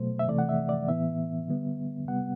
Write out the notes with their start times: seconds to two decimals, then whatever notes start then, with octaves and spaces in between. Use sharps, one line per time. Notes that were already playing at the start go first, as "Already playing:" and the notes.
Already playing: B2 F#3 A3 C5
0.19 E5
0.28 C3 E3 A3 D5
0.39 F#5
0.49 E5
0.69 D5
0.88 A2 E3 B3 E5
1.48 D3 G3 B3
2.08 C3 G3 B3 F#5